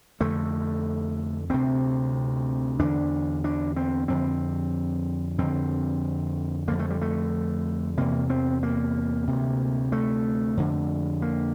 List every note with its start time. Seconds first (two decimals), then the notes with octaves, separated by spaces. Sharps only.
0.20 F2 D3 A3
1.50 D2 C3 C4
2.79 E2 D3 D4
3.44 D4
3.76 C4
4.08 F2 D3 C4
5.38 F2 D3 C4
6.68 F2 D3 A#3
6.79 A3
6.90 G3
7.02 A3
7.97 E2 C3 A#3
8.30 C4
8.63 A#3
9.27 D2 C3
9.92 A3
10.57 F2 D3
11.22 A#3